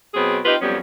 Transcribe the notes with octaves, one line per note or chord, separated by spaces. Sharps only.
B2 F#3 C4 G#4
C4 D#4 F4 G4 B4
F2 F#3 G3 B3 C#4